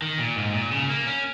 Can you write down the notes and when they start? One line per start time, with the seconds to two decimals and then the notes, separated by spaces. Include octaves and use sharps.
0.02 D#3
0.19 A#2
0.36 G#2
0.54 A#2
0.72 C#3
0.89 A#3
1.06 C#4